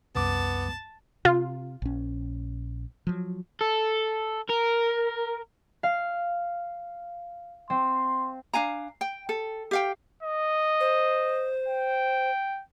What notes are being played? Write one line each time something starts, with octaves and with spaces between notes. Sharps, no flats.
C2 F#2 B3 A5 D6
C3 F4
A#1 C#4
F3 F#3
A4
A#4
F5
C4 C6
D4 F5 G#5 A#5
G5
A4
G4 F5 G5
D#5
C5
G5